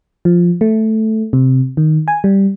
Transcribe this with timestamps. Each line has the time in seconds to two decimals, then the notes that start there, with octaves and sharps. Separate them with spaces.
0.25 F3
0.61 A3
1.33 C3
1.77 D#3
2.08 G#5
2.24 G3